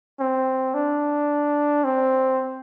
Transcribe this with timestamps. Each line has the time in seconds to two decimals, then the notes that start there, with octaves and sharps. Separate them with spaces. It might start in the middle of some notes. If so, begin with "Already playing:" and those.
0.20 C4
0.74 D4
1.84 C4